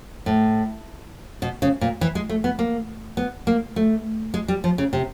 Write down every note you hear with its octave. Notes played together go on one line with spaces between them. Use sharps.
A2
B2
C#3
A#2
E3
G#3
A3
B3
A#3
B3
A#3
A3
G#3
G3
F3
C#3
C3